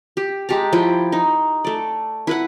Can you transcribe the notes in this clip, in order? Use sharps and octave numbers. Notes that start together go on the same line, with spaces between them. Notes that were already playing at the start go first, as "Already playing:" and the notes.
G4
G#3 G4 A5 A#5
F3 E4 G5
D#4
A3 D5
E4 B4 F#5